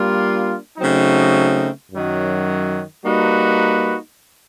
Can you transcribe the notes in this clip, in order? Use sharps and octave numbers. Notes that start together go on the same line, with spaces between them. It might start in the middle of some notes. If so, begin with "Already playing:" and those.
Already playing: G3 A#3 D4 F4
C#3 F#3 A3 C4 D#4
F#2 D#3 F#3
G3 A#3 D#4 F#4 B4